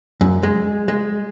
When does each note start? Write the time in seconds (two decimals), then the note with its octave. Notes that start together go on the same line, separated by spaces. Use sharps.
0.21 F#2
0.43 G#3
0.88 G#3